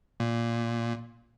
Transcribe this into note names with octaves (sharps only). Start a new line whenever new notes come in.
A#2